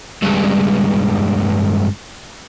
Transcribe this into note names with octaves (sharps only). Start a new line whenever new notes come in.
C#2 G2